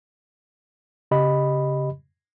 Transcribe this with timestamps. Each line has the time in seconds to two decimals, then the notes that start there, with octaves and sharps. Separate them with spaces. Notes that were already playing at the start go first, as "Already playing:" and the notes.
1.11 C#3 G4 D#5 B5